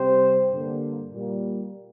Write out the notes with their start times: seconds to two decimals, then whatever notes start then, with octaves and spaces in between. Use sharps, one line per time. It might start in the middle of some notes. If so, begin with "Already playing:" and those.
Already playing: C3 G3 C4 G4 C5
0.51 G2 D3 A#3
1.12 A#2 G3 A#3